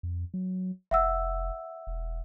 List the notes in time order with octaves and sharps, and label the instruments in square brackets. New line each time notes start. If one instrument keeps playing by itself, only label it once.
[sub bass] F2
F#3
[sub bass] F1 [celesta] E5 F#5 E6
[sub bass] E1